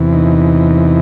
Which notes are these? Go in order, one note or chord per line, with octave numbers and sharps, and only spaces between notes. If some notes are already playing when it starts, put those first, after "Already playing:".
Already playing: E2 C3 E3
D#4